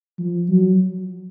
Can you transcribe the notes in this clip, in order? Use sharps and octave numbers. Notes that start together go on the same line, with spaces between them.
F3
F#3